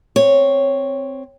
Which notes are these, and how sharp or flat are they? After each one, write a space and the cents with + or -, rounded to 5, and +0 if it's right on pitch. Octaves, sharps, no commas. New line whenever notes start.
C4 +0 C#5 +0